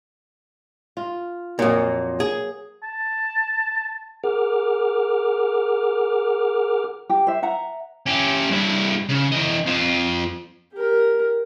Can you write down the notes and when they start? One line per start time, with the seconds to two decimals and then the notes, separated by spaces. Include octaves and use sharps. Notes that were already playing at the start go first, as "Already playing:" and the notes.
0.97 F4
1.59 F2 A#2 F#3 A#3
2.20 G#4
2.83 A5
4.24 G#4 A#4 F#5 D6 F6
7.09 G4
7.27 C5 E5
7.42 E5 F#5 A#5
8.06 C#4 G4
8.51 G2 E4
9.09 C#3
9.32 E3 D#5
9.66 F2 F4
10.73 G4 A#4